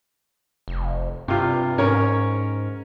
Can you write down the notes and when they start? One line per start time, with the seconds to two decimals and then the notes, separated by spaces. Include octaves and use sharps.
0.68 F1
1.28 G2 C3 F4
1.78 G#2 C#4 A#4 C#5